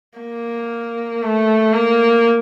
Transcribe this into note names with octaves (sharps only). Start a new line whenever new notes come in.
A#3
A3
A#3